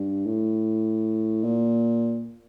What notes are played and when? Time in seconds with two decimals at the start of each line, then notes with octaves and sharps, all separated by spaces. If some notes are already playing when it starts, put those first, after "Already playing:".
Already playing: G2
0.26 A2
1.44 A#2